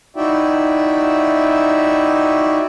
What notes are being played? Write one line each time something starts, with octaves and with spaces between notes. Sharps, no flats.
D#4 E4 F#4 D5 E5 G5